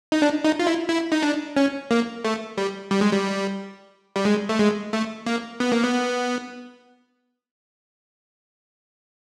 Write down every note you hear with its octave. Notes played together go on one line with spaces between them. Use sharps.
D#4
D4
D#4
F4
E4
E4
D#4
D4
C#4
A#3
A3
G3
G3
G#3
G3
G3
G#3
A3
G#3
A3
A#3
B3
A#3
B3